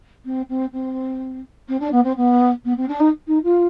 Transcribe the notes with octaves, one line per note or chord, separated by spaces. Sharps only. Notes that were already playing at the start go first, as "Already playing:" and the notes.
C4
C4
C4
C4
D4
B3
C4
B3
B3
C4
D4
D#4
D#4
F4